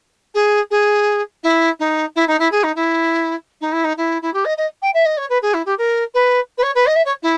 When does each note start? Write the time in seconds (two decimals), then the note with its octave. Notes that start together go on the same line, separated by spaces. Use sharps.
0.34 G#4
0.70 G#4
1.43 E4
1.79 D#4
2.16 E4
2.28 D#4
2.39 E4
2.51 G#4
2.63 D#4
2.76 E4
3.61 D#4
3.72 E4
3.84 D#4
3.97 E4
4.22 E4
4.33 G4
4.45 D#5
4.57 D#5
4.82 G5
4.94 E5
5.05 D#5
5.17 C#5
5.29 B4
5.42 G#4
5.54 E4
5.66 G4
5.78 A#4
6.14 B4
6.58 B4
6.62 C#5
6.75 B4
6.86 D#5
6.95 E5
7.05 C#5
7.22 E4